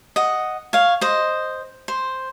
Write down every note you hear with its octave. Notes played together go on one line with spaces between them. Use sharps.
D#5 F#5
C#5 F5
C5 D#5
C5